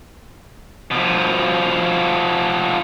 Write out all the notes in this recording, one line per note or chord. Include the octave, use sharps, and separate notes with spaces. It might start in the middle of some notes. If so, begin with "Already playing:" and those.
B2 F3